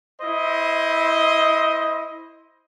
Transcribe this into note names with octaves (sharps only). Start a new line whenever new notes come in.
E4 C5 D#5